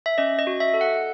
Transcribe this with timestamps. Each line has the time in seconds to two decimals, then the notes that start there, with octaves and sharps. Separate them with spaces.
0.06 E5
0.18 C#4 D#5
0.39 D#5
0.47 F#4
0.60 E5
0.74 A4
0.81 F#5